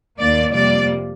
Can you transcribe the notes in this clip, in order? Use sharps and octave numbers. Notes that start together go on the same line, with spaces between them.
D#2 D#3 A#3 D5
F2 C3 G3 A#3 D5